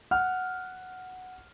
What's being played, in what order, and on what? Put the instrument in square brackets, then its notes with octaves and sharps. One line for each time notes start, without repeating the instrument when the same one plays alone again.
[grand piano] F#5 F6